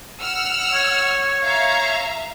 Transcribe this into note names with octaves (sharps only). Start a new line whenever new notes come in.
F#5 E6 F6
C#5
E5 F5 A#5